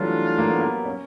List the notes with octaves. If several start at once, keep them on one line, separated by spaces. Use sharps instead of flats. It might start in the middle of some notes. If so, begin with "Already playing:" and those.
Already playing: E3 F#3 G3 A3 D4 F4
A#3
B3
A#3
C#4